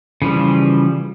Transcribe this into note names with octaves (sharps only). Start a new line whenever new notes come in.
C#3 E3 F3 G3